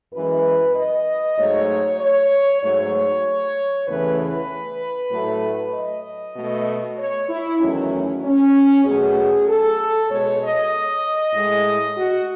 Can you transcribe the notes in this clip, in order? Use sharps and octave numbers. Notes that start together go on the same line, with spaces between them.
F#2 E3 G#3 B4
D#5
G#2 F#3 A3 C#5
C#5
G#2 F#3 A3 C#5
E2 C#3 E3 A3 B4
B4
A2 F#3 A3
D#5
B2 A3
C#5
E4
E2 D#3 F#3 A3 C#4
C#4
B2 F#3 A3 G#4
A4
B2 G#3 C#5
D#5
A2 G#3
F#4